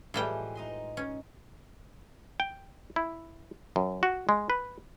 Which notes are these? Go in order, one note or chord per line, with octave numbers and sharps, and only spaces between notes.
A2 E3 F3 G3 G#3 G5
D#4 D#5 C6
C#4
G5
E4
F#2
F#4
G#3
B4